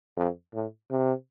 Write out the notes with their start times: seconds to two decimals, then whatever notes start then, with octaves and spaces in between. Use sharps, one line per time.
0.17 F2
0.54 A2
0.90 C3